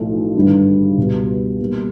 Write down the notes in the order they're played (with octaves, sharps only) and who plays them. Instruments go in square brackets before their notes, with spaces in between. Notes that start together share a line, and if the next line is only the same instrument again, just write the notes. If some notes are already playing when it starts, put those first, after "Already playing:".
Already playing: [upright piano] B1 A2 F3 A3
G#1 G2 D3 G3
C#2 B2 G3
B2 G3 A#3